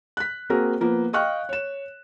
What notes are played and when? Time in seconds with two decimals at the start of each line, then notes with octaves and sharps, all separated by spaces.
0.17 F#6 B6
0.50 A#3 C4 F#4 G#4 A#4
0.80 F3 A#3 B3
1.13 D#5 F5 G5 C#6 F6 F#6
1.49 C#5 E7